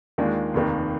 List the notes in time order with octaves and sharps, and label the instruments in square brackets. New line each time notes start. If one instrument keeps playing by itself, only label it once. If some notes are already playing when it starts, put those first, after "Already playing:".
[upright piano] D#2 D#3 G#3 D4 F4
F1 D#2 D#3 A#3